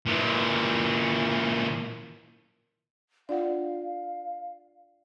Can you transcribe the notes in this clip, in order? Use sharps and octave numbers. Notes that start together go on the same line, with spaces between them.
A#2 E3
D4 F4 D5 F5 F#5